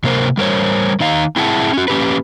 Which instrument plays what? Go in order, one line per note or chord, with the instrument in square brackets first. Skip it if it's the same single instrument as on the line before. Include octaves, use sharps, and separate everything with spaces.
[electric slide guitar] C3 A#3 A#4 C5
G3 A#4 C5 C#5
D#3 D#4 D#5 F5 A#5
C4 E4 G#4 E5 F#5 A5
C#4 F#4
A#3 C#4 G4 B4